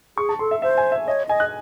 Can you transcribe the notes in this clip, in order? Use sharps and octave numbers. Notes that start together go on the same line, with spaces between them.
G#4 C#6
A5
A4 C6
E5
C5 E5
G#5
E5
C#5 D#5
D#5 G#5
F#6